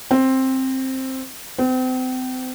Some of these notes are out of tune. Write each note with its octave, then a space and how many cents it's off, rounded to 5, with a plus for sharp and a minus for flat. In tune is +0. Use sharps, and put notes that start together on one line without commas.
C4 +10
C4 -35